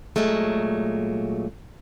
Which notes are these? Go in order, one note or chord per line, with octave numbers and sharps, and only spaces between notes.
A#2 F#3 G#3 A3